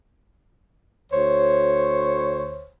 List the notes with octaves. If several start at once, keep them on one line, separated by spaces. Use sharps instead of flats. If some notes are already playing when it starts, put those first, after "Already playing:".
D2 C5 C#5